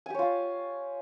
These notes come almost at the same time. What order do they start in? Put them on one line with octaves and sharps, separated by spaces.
G#5 G4 C#5 F4